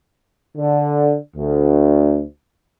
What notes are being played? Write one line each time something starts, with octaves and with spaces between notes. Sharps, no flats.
D3
D2